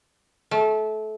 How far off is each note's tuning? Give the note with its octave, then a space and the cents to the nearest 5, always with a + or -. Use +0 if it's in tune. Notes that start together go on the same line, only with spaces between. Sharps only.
A3 -25